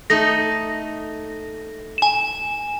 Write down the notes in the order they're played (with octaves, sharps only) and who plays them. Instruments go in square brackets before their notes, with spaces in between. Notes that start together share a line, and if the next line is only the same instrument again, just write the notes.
[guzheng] A3 D#4 [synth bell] A#6
[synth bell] G#5 E7